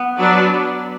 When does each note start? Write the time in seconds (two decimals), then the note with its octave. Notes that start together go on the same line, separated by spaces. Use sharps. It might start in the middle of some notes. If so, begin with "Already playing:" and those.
Already playing: B3
0.17 F#3 D4 B4 D5